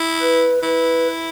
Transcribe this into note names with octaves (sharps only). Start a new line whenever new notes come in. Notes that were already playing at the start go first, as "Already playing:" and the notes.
Already playing: E4
B4
E4 B4